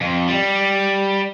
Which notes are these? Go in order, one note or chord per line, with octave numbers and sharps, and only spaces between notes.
F2
G3